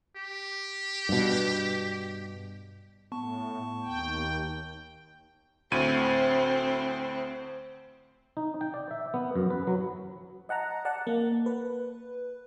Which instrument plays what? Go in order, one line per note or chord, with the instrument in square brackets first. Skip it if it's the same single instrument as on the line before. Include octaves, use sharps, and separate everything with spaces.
[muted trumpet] G4
[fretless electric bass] G2 B2
[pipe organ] A2 [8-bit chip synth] B3 A5 C#6
[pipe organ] D#2 G5
[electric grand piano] D2 A2 D#7 [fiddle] C4
[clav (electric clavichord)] D#4
G5
D5
E5
B3
F#2
B4
F#3
[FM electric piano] D#5 F#5 A5 A#5
D5 F#5 A5
A#3
B4